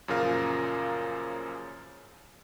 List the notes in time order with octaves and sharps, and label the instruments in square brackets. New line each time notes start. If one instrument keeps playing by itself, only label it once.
[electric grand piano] F#2 A#2 C#3 F3 A#4 F5